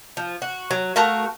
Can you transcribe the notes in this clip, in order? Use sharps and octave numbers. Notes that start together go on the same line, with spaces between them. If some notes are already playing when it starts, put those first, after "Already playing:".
F3
F#4
F#3
A3 F#4 A#4 F5